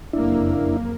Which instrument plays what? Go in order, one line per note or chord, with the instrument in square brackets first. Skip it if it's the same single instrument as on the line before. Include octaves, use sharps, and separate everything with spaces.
[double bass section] F#1 F2 A#3 [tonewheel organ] D4 E4